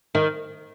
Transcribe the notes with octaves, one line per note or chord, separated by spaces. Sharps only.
D#3